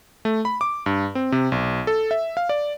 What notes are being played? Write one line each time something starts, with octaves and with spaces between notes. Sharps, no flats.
A3
B5
D6
G2
C4
C3
B1
A4
E5
F5
D5